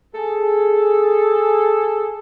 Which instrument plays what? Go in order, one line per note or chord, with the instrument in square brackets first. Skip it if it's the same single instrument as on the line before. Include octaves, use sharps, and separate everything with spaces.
[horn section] G#4 A4